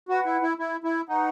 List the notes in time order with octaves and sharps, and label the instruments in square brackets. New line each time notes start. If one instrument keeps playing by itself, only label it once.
[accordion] F#4 [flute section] B4 F#5 B5
[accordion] E4
E4
E4
E4
[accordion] D#4 [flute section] B4 F#5 A#5 C#6